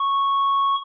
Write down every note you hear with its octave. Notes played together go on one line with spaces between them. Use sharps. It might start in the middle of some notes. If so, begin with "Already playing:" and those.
Already playing: C#6